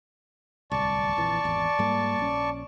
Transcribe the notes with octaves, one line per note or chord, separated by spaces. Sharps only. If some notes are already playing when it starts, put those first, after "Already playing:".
D1 C2 D5 A5 C#6
A#1 F2 E3
G#1 E2
G#2 G3 A#3
A#1 C#4